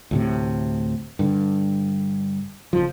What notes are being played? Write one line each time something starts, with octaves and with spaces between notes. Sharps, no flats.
D2 A2 C3
G2 D3
F#1 F2 F3